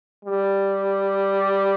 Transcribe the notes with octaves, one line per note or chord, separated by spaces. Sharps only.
G3